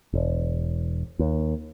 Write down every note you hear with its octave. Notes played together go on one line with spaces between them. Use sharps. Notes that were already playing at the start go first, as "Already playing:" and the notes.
E1
D#2